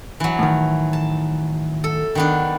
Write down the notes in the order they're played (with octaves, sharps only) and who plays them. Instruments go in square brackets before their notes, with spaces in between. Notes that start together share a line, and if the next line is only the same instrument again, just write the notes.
[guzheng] E3 F#3
[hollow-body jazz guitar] A2 D#3
[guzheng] A5
A4
D#3 B3 D4